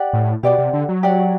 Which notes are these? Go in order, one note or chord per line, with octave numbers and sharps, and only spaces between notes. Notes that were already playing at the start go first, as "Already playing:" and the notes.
Already playing: G4 D5 F#5
A2
B2 G4 D5 F#5
C3
D3
F#3
G4 D5 F#5